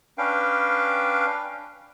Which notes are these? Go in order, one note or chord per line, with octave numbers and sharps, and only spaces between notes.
C#4 D4 B4 F5 G5